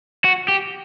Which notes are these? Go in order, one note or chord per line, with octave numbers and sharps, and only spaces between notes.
F#4
G4